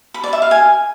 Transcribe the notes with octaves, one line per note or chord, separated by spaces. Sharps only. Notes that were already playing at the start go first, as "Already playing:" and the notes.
B5
D5
E5
F5
G#5